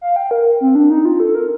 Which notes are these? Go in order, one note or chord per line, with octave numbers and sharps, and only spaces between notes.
F5
G5
A#4
C4
D4
D#4
F4
A4
A#4